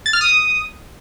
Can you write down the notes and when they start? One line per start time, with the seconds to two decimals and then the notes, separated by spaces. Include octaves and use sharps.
0.06 A6
0.13 F6
0.21 D#6